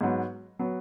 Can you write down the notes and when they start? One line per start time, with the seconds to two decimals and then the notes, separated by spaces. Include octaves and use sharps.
0.01 G#2 F#3 B3
0.59 F#3 B3